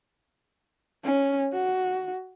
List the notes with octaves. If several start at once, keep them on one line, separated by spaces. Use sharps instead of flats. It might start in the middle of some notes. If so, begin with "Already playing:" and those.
C#4
F#4